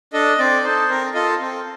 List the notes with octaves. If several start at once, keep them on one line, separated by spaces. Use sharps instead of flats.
D4 A4 D#5
C4 D5
D#4 A4 C5
C4 A#4
F4 A4 D#5
C4